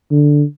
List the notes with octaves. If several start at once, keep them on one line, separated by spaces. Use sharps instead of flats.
D3